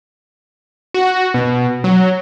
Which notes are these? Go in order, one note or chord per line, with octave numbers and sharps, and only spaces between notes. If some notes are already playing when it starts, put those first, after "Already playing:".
F#4
B2
F#3